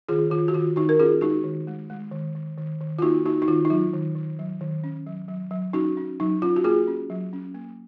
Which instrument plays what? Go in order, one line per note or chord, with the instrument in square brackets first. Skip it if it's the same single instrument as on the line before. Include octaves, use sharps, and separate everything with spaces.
[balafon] D#3 F4 G#4
D#3 F4
F#4
D#3 F4
D#3 D#4 F#4
A#4
C#4 F4 G#4
G#3 D#4 F#4
D#3
G#3
G#3
D#3
D#3
D#3
D#3
F4
A#3 D#4 F#4
A#3 D#4 F#4
D#4
D#3 F4
D#4
F#3 F4
D#3
D#3
F#3
D#3
C#4
F#3
F#3
F#3
C#4 D#4 F#4
C#4
F#3 D#4
C#4 F4
F#4
A#3 F4 G#4
C#4
F#3
C#4
A#3